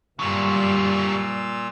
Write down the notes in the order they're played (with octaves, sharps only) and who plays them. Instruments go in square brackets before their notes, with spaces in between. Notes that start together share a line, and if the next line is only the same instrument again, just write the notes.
[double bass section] G2 [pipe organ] A#2 F4 E6 [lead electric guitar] F#3 G3